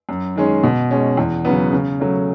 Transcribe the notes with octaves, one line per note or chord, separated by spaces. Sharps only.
F#2
D#3 G#3 C#4
B2
G#3 C#4
E2
C#3 F#3 B3
C#3
F#3 A3 C#4